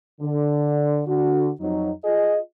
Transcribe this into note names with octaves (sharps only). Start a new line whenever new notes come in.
D3
D3 F#4
F2 F#3 D#4
F4 G#4 D#5